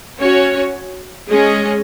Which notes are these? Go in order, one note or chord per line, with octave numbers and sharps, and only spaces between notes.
C#4 F#4 C#5
G#3 C#4 G#4 D#5